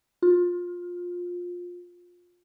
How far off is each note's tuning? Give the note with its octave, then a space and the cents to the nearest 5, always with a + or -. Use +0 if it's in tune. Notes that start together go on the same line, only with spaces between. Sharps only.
F4 +20